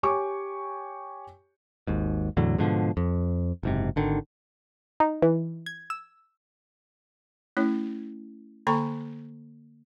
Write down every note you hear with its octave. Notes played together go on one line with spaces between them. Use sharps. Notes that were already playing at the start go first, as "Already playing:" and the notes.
G4 C#5 G#5 C#6 D6
G#1 D#2 G#2
E2 A2 D3 F#3
G#2 B2 D3 F3
F2
F#1 G#2 C3
G#1 D3 D#3
D#4
E3
G#6
E6
A3 C#4 E4 C#5
D3 A#3 A4 G5 A#5 C#6